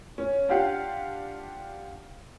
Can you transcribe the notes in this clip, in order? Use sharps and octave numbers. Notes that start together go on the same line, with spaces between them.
C#4
D4 F4 G4 F5 F#5